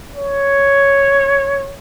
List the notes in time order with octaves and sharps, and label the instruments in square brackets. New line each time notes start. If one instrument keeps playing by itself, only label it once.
[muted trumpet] C#5